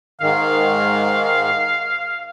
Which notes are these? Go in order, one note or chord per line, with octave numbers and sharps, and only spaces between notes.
G#2 D#3 F5